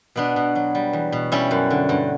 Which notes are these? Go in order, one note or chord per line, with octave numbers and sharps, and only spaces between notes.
B2 B3 D4
B2
F#3
G3
E2
B2
G3 C#4 E4
F#2
D3
G2